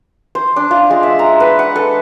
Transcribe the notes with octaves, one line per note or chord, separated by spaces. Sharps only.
C5
D4
F4
G#3
E5
A#5
B4
F#5
A4